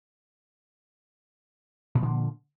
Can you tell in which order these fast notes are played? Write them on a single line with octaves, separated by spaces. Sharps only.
A#2 F3 D3 A#3